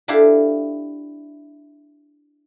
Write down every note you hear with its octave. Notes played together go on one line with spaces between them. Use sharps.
D4 E4 G4 A4 F5